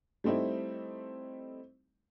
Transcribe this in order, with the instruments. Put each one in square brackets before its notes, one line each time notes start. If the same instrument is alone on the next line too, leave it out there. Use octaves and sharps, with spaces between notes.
[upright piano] G3 A3 C4 D#4 E4